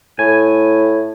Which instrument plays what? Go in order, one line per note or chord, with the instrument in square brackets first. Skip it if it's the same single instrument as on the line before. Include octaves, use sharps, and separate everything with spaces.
[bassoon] A2 [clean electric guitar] G#5